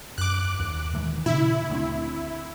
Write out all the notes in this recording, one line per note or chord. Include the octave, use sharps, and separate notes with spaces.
F#2 D6 F#6
D#2
D#3 E3 G#3
A#2 C#3 E4
D2 G3 C4